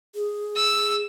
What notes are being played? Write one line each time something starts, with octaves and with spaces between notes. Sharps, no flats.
G#4
E6